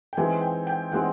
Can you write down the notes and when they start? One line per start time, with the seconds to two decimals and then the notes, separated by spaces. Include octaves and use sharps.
0.13 G5
0.17 E3 G#3 C4 D#4 G#5
0.41 G5
0.67 G5
0.92 E3 G#3 C4 D#4 F#5